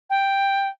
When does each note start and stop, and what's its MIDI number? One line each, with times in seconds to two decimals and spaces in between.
0.09 0.67 79